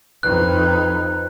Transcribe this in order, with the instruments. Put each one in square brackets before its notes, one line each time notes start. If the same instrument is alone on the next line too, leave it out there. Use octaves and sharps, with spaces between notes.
[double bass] F2 D#4 [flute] B4 [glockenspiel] F#6